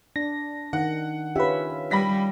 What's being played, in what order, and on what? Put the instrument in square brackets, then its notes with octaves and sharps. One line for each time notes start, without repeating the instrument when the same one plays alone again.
[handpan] D4 [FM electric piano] A#6
[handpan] D#3 [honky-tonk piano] F#5
[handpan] C#4 F4 E5 [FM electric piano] G4 B4
[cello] G3 [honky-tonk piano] B5 A#6 B6